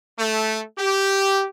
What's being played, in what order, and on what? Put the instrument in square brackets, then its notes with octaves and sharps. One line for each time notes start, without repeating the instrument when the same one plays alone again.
[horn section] A3
G4